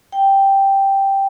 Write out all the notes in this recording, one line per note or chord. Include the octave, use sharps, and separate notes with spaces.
G5